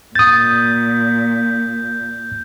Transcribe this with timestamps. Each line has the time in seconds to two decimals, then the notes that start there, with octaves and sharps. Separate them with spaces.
0.15 A#2 D#6 G6 A6